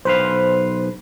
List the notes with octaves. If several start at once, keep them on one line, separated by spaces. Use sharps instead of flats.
B1 B4 C5 F5